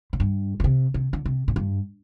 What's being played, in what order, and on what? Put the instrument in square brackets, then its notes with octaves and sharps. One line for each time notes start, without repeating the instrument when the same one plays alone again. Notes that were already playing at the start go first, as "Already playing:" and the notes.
[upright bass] A#2
G2
D3
C3
C3
D3
C3
A#2
G2